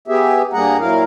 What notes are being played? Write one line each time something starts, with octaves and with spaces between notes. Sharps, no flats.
B3 G4 G#4 E5
G2 G3 A#3 G#4 F#5 A#5
A#2 F#3 E4 A#4 F5